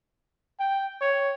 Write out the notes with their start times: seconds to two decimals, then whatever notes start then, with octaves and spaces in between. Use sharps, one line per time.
0.60 G5
1.01 C#5